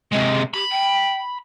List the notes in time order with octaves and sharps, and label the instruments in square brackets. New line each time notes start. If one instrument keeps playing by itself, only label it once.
[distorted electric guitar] C3 G#3 [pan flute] D#5
[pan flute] G4 [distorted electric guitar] B5
[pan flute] G5